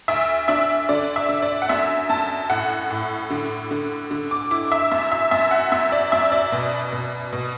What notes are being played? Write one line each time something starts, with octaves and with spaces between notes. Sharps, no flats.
D2 E5
D4 E5
D3 D5
E5
D3
D5
F#5
F#2 E5
F#2 A5
A2 F#5
A2
D3
D3
D3
D6
E4 D6
E5
F#2 E5
E5
F#2 E5
F#5
F#2 E5
D5
F#2 E5
D5
B2
B2
B2